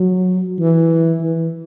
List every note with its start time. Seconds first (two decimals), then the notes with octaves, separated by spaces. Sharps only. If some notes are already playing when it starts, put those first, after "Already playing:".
Already playing: F#3
0.59 E3
1.22 E3